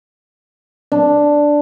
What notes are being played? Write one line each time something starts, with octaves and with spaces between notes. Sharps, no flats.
D4